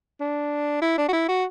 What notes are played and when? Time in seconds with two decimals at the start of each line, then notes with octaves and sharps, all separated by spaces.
0.20 D4
0.82 E4
0.98 D4
1.08 F#4
1.13 E4
1.28 F#4